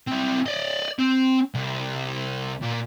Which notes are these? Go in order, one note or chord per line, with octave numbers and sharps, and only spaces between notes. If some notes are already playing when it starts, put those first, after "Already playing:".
C4 E4
D5 D#5
C4
C2
A#2